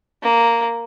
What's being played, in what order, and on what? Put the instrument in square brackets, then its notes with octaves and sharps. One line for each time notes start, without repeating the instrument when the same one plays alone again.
[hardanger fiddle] A#3